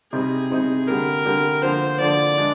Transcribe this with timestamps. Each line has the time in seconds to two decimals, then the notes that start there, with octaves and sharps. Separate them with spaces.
0.13 C3 G3 C4 D#4 G#4
0.50 C3 G3 C4 D#4
0.87 D3 G3 A#3 A#4
1.25 D3 G3 A#3
1.63 D3 F3 A#3 C5
2.00 D3 F3 A#3 D5
2.38 G#3 D4